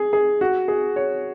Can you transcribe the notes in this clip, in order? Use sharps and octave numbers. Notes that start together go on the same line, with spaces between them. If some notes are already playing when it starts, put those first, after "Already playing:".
Already playing: G#4
G#4
F#4
G#4
C#5